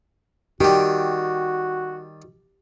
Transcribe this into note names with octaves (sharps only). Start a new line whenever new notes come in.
D#3 G3 F#4 G4